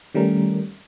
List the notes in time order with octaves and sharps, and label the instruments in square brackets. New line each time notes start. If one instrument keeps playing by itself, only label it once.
[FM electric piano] D#3 G3 A3 C#4 A#4